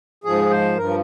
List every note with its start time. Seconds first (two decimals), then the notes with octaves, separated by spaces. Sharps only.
0.24 G#2 F3 G#4
0.50 C5
0.77 G2 F3 A#4